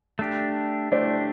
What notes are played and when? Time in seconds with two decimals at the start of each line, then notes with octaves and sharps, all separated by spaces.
0.19 A3 D4 G4
0.92 A3 D4 G4 C5 D5